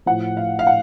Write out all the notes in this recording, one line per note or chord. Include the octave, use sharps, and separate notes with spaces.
A2 F3 F#5
F5
F5
F#5